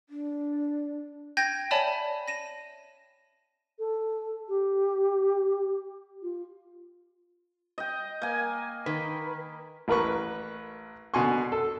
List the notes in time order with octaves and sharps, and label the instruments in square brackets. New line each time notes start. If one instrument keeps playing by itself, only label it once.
[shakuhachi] D4
[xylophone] G5 G6 G#6 A#6 D#7
C#5 D5 E5 G#5 A5 B5
A#6 D#7 E7
[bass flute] A4
G4
F4
[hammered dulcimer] D#5 G5
A#3 G#5
[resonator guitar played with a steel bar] D#3 [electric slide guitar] B4
[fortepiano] A1 A#4 B4 C#6
B2 D3 F#4 G#5 C6 C#6
A4